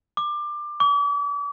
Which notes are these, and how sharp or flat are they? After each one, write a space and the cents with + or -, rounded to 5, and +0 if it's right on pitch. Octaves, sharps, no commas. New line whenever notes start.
D6 +20
D6 -40